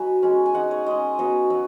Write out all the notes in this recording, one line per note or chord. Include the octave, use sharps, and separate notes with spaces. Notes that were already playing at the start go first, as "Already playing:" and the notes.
Already playing: F#3 B3 D#4 G#5 B5
G#3 C#4
G#5
G#3 D#4 F#5
C#5
G#3 C#4 D#5
F#3 B3 D#4
F#3